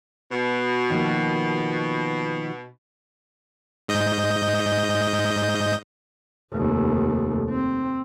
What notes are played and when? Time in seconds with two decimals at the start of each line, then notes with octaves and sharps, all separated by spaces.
0.31 B2
0.90 D#3 F3 A#3
3.88 G#2 D#5 G6
6.53 F1 D#2
7.49 C4